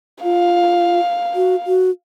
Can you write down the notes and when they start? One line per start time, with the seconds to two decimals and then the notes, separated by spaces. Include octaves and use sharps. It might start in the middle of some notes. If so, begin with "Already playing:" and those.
0.23 F4 F5
1.35 F#4
1.67 F#4